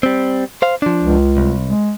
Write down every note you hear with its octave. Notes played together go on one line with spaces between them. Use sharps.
G3 C4
C5 F5
F3 D4
C#2
C2
G#3